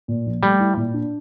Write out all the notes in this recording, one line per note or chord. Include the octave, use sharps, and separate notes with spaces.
A#2
A#1
G3 A3
E4
A#2
D4